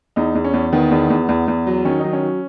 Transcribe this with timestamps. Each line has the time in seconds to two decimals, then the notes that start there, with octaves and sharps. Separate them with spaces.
0.16 E2 D#4
0.35 E2
0.44 C#4
0.53 E2
0.73 D#3 B3
0.91 E2
1.10 E2
1.29 E2
1.48 E2
1.67 F#3
1.85 D#3 C#4
1.99 F#3 D#4
2.13 C#4
2.23 F#3